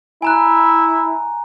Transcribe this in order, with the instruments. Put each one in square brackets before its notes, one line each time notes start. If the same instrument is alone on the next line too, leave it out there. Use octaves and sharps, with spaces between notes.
[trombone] E4 [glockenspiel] G#5 A#5 F#6